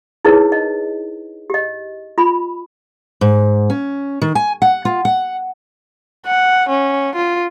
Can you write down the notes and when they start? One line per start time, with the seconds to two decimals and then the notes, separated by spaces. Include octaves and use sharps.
0.25 D#4 E4 G#4 A#4 B4 C#5
0.52 D#5
1.50 G4 D#5
2.18 F4 B5
3.21 G#2
3.70 C#4
4.22 D#3
4.35 G#5
4.62 F#5
4.85 F4
5.05 F#5
6.26 F#5
6.69 C#4
7.15 F4